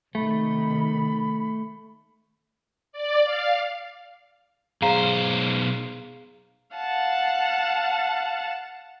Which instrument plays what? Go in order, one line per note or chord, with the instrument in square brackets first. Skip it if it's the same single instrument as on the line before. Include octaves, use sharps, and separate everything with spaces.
[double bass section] C3 D#3 [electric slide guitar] A3 [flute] B5
[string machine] D5
F5
[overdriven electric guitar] B1 C5 [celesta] G#4 F5 A#5
[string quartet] F5 F#5 A5